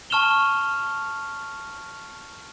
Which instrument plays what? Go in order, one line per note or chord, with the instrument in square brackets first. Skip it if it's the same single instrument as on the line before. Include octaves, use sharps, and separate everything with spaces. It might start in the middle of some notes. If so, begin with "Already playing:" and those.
[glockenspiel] A5 C#6 F6 E7 F7 G7